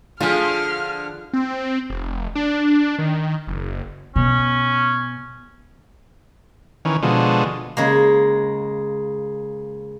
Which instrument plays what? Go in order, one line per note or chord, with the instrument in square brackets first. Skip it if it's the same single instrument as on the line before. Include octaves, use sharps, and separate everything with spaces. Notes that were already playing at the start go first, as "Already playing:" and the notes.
[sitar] D3 F3 [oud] F4 G#4 [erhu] F6
[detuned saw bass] C4
F1
D4
D#3
F#1
[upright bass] B2 [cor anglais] C#4
[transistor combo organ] D#3 E3 C#4
B2 D3 F3 G#3
[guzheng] C#3 G#3 A#3